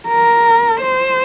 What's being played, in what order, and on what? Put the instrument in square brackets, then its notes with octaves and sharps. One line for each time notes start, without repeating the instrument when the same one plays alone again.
[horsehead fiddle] A#4
C5